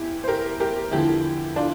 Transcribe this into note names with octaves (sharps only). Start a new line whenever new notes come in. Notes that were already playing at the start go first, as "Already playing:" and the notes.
Already playing: E2 E3 E4 G4
C5
G4 A#4
G4 A#4
E2 D3 F3 E4 G4
D4 F4